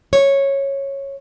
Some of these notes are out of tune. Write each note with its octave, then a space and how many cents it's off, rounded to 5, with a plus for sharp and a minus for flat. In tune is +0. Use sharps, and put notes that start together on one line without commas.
C#5 -10